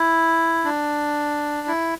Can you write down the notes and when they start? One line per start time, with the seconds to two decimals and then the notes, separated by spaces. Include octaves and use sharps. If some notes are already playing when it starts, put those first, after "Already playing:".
Already playing: E4
0.65 D4
1.68 E4